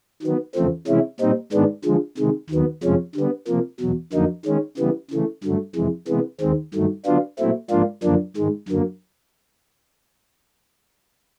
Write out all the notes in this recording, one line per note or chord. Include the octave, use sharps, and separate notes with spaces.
D#3 F#3 B3
E2 C#3 F3 A3 C4
C3 E3 G#3 C#4 E4
A#2 G3 C4 D#4
G#2 D#3 G#3 B3 D4
D3 F3 G#3
C3 D#3 G#3
D#2 D#3 F#3 B3
F2 C3 F3 G#3 C#4
D3 G3 B3
C3 F3 A#3
E2 B2 F#3
F2 D3 F#3 A#3 D#4
D#3 G#3 C#4
C#3 E3 G3 B3
C#3 E3 A3
G2 D3 F#3 A3
F2 C3 E3 G#3
C3 E3 G#3 B3
D#2 D#3 G#3 C4
G2 D#3 F#3 A3
D3 F#3 B3 D4 F4
A#2 F#3 A3 C4 E4
G#2 F3 A#3 D4 F4
F#2 D3 F3 A#3 D4
G#2 D#3 G#3
F#2 D3 F#3 A#3